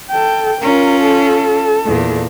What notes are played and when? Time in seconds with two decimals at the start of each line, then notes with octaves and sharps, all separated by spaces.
0.10 A4 G5
0.62 C#4 F4 A#4
1.02 A4
1.86 E2 A#2